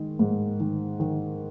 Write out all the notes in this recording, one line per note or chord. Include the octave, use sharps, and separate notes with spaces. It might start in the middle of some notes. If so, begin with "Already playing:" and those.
Already playing: D#3 G#3
G#2
D#3
D#3